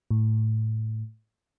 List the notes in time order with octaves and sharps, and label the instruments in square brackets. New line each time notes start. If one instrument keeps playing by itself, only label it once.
[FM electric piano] A2